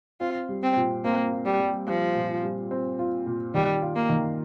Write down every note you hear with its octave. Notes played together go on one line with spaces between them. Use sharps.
C4 F4
G3
C4
A#2
A#3 C4
F4
G3
G3
F3 G3
A#2
G3
C4
F4
A#2
D#3 G3
F4
A#3
D#3